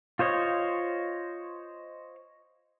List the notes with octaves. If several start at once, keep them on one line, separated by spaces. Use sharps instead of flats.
F4 C5 C#5 D#5